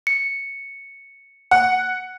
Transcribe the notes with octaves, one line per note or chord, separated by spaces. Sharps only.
C#7
F#5